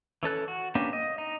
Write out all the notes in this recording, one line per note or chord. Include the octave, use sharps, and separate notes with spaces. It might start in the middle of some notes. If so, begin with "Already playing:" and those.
E3 C#4 A4 F#6
F#4
A#3 B3 C#4 D4 G4
D#5
D#4